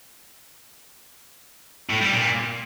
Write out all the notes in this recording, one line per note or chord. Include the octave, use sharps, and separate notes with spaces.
A2
G3
A#2